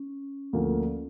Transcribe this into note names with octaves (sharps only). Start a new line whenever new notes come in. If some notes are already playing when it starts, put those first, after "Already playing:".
Already playing: C#4
D2 D3 F3 A#3